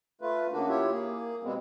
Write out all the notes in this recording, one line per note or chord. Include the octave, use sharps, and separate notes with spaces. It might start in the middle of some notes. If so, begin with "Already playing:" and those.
A3 F4 B4
C#3 A#3 D4 F#4
E4 F4 G4 C#5 E5
A#3 G#4
B2 G3 G#3 B3 C4